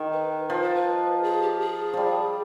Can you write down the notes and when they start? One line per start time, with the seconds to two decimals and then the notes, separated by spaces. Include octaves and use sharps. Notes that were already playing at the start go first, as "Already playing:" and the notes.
Already playing: D#3
0.13 B4
0.49 F3 B4
0.62 C5
0.75 B4
1.23 G#4
1.42 G4
1.60 G#4
1.93 F3 G3